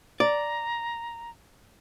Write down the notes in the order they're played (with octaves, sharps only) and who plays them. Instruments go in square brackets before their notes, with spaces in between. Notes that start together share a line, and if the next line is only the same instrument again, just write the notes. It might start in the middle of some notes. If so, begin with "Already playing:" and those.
[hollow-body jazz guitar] D5 [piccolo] A#5